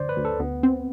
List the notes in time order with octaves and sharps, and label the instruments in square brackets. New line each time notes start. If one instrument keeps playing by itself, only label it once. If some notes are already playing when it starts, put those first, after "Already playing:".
Already playing: [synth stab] D2 [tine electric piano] C5 D5
[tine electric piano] B4
[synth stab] D2
[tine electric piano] A4
[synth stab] D2 [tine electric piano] B3
[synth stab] C4